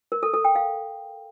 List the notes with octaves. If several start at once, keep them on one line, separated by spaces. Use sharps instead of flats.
A#4
A4
A4
G5
F5